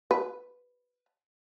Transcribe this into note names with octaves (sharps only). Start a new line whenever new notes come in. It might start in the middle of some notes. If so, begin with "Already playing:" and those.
B4